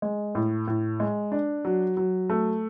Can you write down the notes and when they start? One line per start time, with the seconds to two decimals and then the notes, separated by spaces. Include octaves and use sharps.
0.02 G#3
0.35 A2
0.68 A2
1.00 G#3
1.32 D4
1.65 F#3
1.97 F#3
2.30 A3